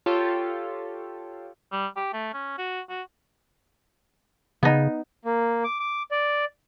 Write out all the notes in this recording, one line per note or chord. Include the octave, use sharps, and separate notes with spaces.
F4 G4 A4 C#5
G3
G4
A3
C#4
F#4
F#4
C#3 B3 D#4
A#3
D6
D6
D5